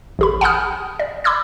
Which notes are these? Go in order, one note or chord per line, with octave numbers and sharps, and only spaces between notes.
A1 G4 B5
F#5 G#5 A5 B5 D#6 F6
D5
B5 D6 E6 G#6